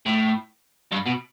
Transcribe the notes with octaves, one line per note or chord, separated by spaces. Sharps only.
A2
G2
B2